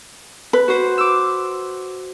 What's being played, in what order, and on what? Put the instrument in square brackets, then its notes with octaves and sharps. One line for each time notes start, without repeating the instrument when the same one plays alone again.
[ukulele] B4
[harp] F#4 C5
D6 E6